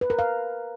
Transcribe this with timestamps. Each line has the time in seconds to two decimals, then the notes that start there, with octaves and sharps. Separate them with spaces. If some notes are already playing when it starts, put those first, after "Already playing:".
0.01 B4
0.10 A#4
0.19 F5